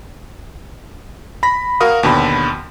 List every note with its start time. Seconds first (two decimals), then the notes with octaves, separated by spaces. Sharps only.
1.43 B5 A#6
1.80 F#4 A#4 F5 D#6
2.03 D#2 B2 D3 B5